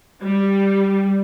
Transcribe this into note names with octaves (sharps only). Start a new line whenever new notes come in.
G3